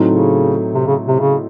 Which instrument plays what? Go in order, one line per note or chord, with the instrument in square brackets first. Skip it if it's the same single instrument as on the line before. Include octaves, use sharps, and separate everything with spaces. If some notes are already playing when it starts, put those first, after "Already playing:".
Already playing: [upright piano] A2 F#3 A3 C4 D#4
[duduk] C#3
C3
C#3
C3
C#3